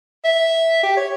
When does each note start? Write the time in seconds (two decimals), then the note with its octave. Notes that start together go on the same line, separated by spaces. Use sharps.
0.24 E5
0.83 G4
0.97 C#5